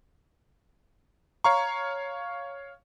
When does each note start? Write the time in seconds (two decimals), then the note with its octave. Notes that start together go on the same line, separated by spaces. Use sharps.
1.44 C#5 F5 A#5 C#6